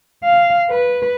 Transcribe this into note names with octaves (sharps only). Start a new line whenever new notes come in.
F5
B4